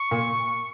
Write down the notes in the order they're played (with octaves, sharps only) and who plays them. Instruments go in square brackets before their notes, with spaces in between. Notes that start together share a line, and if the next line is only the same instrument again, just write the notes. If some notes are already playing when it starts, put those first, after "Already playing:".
Already playing: [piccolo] C#6
[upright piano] A#2